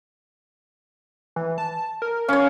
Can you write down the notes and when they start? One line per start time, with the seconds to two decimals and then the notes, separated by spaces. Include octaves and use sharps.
1.36 E3
1.58 A5
2.02 A#4
2.29 C#4 C#5 F5